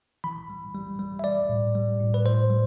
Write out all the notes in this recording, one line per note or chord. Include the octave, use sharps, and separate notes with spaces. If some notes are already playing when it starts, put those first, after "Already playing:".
E3 B5
G3
G3
G3
E5
G3 D5
A2
G3
A2
B4
A2 C5
G3